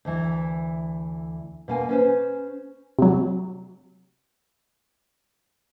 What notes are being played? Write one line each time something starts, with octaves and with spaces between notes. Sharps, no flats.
D2 E3
B2 A#3 G#5
C#4 B4 C5
C3 F#3